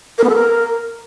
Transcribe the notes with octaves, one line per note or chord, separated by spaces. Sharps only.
A#4
B3
A4
A#4